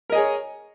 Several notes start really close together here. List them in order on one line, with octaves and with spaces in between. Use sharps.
A#4 D#5 G#4 C#5